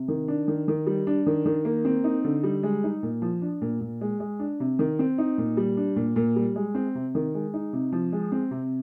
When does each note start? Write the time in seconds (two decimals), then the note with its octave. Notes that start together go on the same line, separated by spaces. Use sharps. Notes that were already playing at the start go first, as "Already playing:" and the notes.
Already playing: C3
0.08 D#3
0.28 D4
0.48 D#3
0.68 D#3
0.87 G3
1.07 D4
1.27 D#3
1.46 D#3
1.65 A#3
1.85 C4
2.04 D#4
2.25 D3
2.44 G3
2.63 G#3
2.84 D#4
3.03 A#2
3.22 F3
3.42 D4
3.62 A#2
3.81 A#2
4.01 G#3
4.20 G#3
4.39 D4
4.60 C3
4.79 D#3
4.99 C4
5.18 D#4
5.38 A#2
5.57 G3
5.77 D4
5.96 A#2
6.16 A#2
6.36 G3
6.56 G#3
6.75 C4
6.95 C3
7.15 D#3
7.34 G#3
7.54 D#4
7.73 C3
7.92 F3
8.12 G#3
8.32 C4
8.51 C3